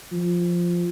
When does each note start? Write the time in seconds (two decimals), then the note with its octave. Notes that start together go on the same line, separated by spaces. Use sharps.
0.12 F3